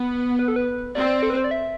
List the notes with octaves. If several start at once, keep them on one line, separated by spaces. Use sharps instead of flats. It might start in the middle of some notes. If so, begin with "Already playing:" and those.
Already playing: B3 B4
B4
A4
B4
C4 D5
A4
B4
C5
D5
E5